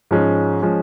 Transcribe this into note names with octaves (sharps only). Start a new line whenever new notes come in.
G#2 F3 G#3 C#4
F3 G#3 C#4